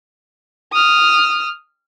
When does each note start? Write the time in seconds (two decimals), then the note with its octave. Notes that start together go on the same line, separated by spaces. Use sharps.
0.73 D#6 F6